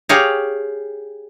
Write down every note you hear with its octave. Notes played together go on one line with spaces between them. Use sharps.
G4 G#4 C#5 F5 A#5